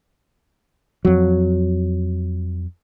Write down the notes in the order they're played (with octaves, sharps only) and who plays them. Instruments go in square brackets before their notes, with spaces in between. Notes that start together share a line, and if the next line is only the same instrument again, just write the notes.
[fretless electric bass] F2 F#3